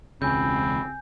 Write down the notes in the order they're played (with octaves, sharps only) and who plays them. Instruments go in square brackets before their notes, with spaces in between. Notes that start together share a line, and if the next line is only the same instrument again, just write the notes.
[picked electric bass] E1 C#2 C#3 [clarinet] C4 [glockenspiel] G#5 G6 [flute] B5